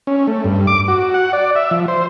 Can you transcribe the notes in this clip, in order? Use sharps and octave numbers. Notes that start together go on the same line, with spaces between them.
C#4
A3
G2
D6
F#4
F#5
D5
E5
F3
C5